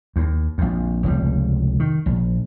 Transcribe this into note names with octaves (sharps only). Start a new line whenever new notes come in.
D#2
A#1 F2
F1 C#2 G3
D#3
A#1